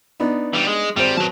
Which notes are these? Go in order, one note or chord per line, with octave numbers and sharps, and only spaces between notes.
B3 D4 D#4
E3 G3
G#3
G#1 G3 C5
F#3 B4 A5